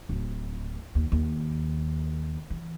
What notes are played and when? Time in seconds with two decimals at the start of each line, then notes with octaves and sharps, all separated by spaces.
0.09 D1
0.95 D#2
1.12 D#2
2.50 E3